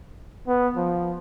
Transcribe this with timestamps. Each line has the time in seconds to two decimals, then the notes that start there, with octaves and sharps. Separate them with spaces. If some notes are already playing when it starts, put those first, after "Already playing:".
0.47 B3
0.77 F3